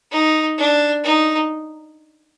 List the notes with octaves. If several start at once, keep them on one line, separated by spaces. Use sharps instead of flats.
D#4
D4
D#4